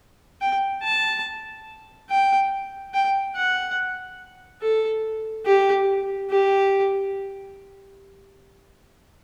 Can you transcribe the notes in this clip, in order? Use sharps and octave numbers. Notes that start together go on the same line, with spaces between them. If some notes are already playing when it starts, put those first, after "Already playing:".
G5
A5
G5
G5
F#5
A4
G4
G4